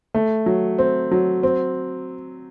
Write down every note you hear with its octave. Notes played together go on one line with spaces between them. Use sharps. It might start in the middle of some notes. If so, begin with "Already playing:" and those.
A3
F#3
C4
F#3
C4